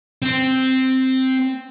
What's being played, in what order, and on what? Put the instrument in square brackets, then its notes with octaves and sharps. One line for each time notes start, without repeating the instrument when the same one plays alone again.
[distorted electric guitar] C4 C5